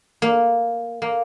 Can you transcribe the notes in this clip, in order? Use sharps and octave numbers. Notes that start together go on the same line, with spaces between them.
A#3
A#3